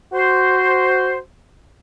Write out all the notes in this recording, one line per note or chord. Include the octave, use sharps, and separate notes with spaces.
F#4 C5